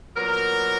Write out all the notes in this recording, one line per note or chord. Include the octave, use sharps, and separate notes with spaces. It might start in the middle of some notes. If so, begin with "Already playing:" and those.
A#2 F#3 B3 A#4